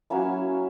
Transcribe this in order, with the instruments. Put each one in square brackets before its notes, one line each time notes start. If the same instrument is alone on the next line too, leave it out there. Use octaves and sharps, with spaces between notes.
[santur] F#3 A#3 C#4 E4